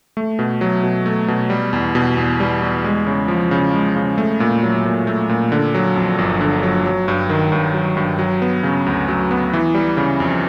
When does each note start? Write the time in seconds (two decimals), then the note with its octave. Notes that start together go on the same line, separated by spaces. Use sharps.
0.17 A3
0.39 B2
0.61 F#3
0.83 B2
1.06 A3
1.28 B2
1.50 G3
1.73 E2
1.95 B2
2.17 E2
2.40 G3
2.62 E2
2.84 G#3
3.07 C#3
3.28 F3
3.51 C#3
3.73 G#3
3.96 C#3
4.18 A3
4.40 A#2
4.63 F#3
4.85 A#2
5.07 A3
5.29 A#2
5.52 D3
5.74 F#3
5.96 F2
6.18 G1
6.41 D3
6.63 F#3
6.85 F#3
7.08 G2
7.29 D#3
7.52 G2
7.74 F#3
7.97 G2
8.19 F#3
8.42 B3
8.63 C#3
8.86 D2
9.08 F#3
9.31 B3
9.53 E3
9.75 G3
9.97 C#3
10.20 F2